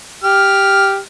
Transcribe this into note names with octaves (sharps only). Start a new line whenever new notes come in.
G4 F6